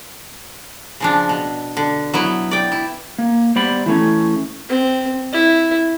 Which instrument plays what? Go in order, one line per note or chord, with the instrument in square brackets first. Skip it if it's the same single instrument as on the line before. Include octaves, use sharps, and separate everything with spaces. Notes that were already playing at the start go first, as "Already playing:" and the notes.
[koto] C#3 F3 D4
B2
D3
F#3 B3 E4
D5 G5
E4
[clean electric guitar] A#3
G3 B3 C5 D5 B5
E3 A3 C#4
[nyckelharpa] C4
E4